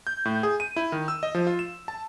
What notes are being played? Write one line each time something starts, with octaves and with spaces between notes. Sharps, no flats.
G6
A2
G#4
D#7
E4
D#3
E6
D#5
F3
F4
E7
A5